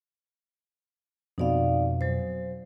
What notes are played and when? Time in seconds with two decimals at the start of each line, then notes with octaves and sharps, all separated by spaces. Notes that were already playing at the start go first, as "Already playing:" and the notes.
1.38 F2 B2 D#4 D5 F5
2.01 F#3 C5